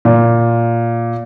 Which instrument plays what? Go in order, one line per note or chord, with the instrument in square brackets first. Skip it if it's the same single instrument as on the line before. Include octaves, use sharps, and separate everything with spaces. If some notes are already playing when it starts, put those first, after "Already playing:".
[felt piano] A#2